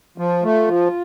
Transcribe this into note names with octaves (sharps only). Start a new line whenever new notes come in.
F3 F4
A3
F3